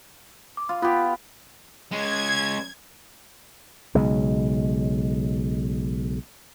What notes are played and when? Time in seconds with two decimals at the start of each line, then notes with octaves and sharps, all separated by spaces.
0.57 D6
0.69 F4
0.82 B3 F4 G4
1.91 G#3 C#4 G#6
3.95 B1 C#3 G#3